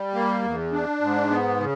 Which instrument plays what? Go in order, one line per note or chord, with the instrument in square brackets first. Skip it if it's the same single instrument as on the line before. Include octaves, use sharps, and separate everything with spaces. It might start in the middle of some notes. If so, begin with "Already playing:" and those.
Already playing: [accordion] G3
A#3
E2
D4
G#2
B3
C#3